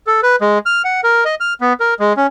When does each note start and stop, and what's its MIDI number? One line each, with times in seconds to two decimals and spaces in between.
0.07 0.21 69
0.23 0.36 71
0.41 0.58 56
0.66 0.82 89
0.84 1.01 78
1.04 1.24 70
1.25 1.35 75
1.40 1.53 89
1.61 1.73 59
1.80 1.94 70
2.00 2.13 56
2.17 2.27 61